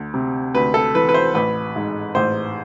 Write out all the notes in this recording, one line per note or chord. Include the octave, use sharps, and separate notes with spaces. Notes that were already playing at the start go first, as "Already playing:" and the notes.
Already playing: D2
C3
D2 B4
A4
E3 B4
B4
C5
A1 B4
G#2
A1 C5